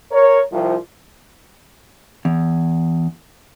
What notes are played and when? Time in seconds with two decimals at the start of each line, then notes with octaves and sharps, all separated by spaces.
0.12 A#4 C#5
0.52 C2 F3
2.25 E2